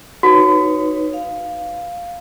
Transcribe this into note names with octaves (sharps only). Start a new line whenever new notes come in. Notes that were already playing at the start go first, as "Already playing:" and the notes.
D#4 F#4 B4 C#5
F5